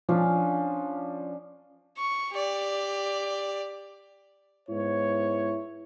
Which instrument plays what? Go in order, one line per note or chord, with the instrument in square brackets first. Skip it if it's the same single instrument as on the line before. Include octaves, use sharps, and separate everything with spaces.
[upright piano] F3 [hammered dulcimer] C#4 D4 F5
[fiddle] C#6
G4 D5
[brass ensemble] G#2 B3 C#5 [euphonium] E4